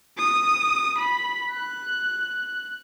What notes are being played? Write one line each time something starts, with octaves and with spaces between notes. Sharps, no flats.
D#6
B5
F#6